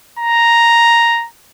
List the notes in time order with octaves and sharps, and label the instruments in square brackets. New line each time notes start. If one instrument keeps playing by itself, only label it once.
[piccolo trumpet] A#5